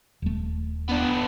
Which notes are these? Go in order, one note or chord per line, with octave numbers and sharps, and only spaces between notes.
D#1 A3
B3 D4